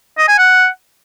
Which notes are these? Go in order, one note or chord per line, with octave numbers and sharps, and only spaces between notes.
D#5
G#5
F#5